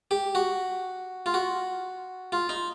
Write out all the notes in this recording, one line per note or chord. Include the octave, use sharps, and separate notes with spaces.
G4
F#4
F4
F#4
F4
D#4